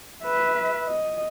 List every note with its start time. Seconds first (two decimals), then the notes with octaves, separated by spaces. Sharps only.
0.24 B4 E5
0.87 D#5